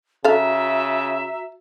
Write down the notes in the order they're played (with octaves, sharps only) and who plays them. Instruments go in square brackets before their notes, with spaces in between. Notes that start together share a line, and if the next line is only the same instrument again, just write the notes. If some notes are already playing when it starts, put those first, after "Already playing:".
[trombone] C#3 [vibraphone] F#4 A#5 [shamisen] A4 F5 [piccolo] E5